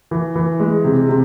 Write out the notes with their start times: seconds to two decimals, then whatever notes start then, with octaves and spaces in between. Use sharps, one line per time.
0.11 E3
0.36 E3
0.60 G#3
0.84 C3
1.09 C3